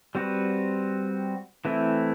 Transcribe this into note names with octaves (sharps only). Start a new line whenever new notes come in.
G3 C4 F#4 B4
E3 A3 C4 E4